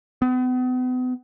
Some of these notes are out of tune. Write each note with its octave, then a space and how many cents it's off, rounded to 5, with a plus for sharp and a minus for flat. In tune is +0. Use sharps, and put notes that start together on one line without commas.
B3 +40